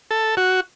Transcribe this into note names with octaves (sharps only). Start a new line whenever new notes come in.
A4
F#4